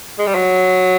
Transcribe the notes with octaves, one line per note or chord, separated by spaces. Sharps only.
G#3
G3
F#3